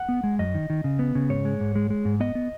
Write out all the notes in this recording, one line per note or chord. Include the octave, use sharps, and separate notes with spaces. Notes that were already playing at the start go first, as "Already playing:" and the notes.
Already playing: F#5
B3
G#3
F#2 D#5
D#3
D#3
C#3
B3
C#3
G#2 C#5
G#3
G#2
G#3
G#3
G#2
B3 D#5
B3